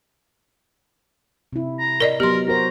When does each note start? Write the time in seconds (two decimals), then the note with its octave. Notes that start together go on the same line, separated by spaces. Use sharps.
1.53 C3 E4
1.79 A#5
2.00 A#4 D5 D#5
2.20 F#3 B3 G4 A#4 C6
2.48 F#4 A#4 C5 A#5